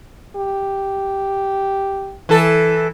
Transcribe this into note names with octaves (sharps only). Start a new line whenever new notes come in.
G4
E3 A4